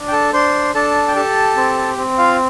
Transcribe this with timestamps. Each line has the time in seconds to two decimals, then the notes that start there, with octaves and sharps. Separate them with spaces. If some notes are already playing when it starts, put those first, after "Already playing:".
Already playing: D4
0.08 G5
0.12 A4 A5
0.33 D4 C5 C6
0.74 D4 A4 A5
1.08 G5
1.16 G4 A4 A5
1.57 C4
1.97 C4
2.18 F4 F5